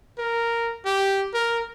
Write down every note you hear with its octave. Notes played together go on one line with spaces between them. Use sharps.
A#4
G4
A#4